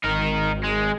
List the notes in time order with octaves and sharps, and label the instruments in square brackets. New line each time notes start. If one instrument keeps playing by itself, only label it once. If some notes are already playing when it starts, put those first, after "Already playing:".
[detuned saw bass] G#1 [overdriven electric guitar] D#4 A#4
[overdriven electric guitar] G#3